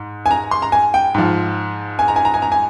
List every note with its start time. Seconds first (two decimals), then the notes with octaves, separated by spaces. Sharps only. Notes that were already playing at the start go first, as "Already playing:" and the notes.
Already playing: G#2
0.26 G#5
0.31 A#5
0.51 C6
0.62 A#5
0.72 G#5
0.94 G5
1.14 G#2 F3
1.99 G#5
2.08 A#5
2.16 G#5
2.25 A#5
2.34 G#5
2.42 A#5
2.52 G#5